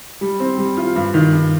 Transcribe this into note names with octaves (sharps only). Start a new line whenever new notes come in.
G3
C4
G3
F4
G2
D#3
G2